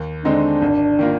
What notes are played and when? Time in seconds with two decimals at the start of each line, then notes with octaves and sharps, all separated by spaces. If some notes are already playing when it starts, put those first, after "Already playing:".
Already playing: D#2
0.25 D3 G#3 C4 D4 D#4
0.62 G#1
0.99 D#3 A#3 F4